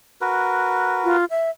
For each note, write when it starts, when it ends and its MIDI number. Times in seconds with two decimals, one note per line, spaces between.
0.21 1.17 66
0.21 1.17 70
0.21 1.17 71
1.04 1.25 65
1.30 1.50 76